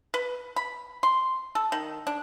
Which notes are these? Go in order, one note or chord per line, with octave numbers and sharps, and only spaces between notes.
B4
B5
C6
A4
D#3
D4